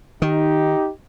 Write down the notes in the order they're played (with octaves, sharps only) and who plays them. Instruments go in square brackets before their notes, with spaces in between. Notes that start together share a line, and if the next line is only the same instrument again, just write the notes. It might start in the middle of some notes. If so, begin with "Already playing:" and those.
[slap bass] D#3 [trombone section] D#4 G4